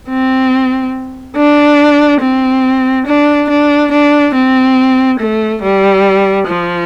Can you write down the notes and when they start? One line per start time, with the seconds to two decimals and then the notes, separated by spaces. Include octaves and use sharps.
0.09 C4
1.37 D4
2.22 C4
3.07 D4
3.50 D4
3.91 D4
4.34 C4
5.19 A3
5.62 G3
6.47 F3